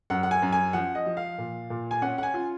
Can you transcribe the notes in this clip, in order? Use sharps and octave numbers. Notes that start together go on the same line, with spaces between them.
F#2 F#5
F#5
G#5
F#2
G#5
F3 F#5
D#5
F3
F5
A#2
A#2
G#5
C#4 F#5
F#5
G#5
F4